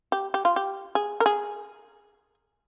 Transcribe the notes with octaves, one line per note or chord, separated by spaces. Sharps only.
G4
G4
F4
G4
G#4
A#4
G#4